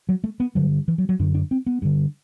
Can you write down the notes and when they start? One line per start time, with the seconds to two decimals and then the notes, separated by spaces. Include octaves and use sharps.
0.09 F#3
0.24 A3
0.40 B3
0.55 G2 D3 F#3
0.88 E3
0.98 F#3
1.09 F#3
1.19 F#2 D3 D4
1.34 D4
1.51 C4
1.66 B3
1.82 G2 D3